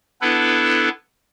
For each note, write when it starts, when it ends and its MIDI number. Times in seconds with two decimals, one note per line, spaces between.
0.21 0.89 59
0.21 0.89 62
0.21 0.89 64
0.21 0.89 69
0.21 0.89 71